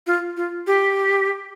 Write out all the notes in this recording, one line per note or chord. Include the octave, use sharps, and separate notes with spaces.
F4
F4
G4